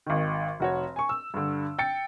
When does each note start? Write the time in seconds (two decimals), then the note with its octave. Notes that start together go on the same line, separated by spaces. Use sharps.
0.07 G#1 D#3
0.60 F1 F#4 C#5
0.96 G#5 C#6
1.09 E6
1.34 G2 D3
1.78 G5 A6 C#7